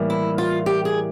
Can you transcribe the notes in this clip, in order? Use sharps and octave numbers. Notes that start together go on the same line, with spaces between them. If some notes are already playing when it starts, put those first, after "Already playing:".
Already playing: A2 E3 G3 A#3
E4
F4
G4
G#4